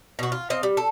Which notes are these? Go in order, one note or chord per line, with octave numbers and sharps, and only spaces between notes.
B2 F#4
F4
C4 D#5 F5
G3
A4